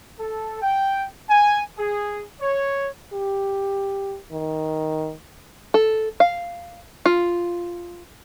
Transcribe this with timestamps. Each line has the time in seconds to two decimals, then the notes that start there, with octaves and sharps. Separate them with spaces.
0.18 A4
0.61 G5
1.29 G#5
1.78 G#4
2.41 C#5
3.13 G4
4.32 D#3
5.74 A4
6.20 F5
7.06 F4